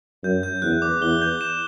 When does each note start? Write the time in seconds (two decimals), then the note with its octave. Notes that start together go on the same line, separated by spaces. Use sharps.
0.24 F#2 G6
0.43 G6
0.62 E2 F#6
0.82 D6
1.01 E2 G7
1.22 G6
1.41 E7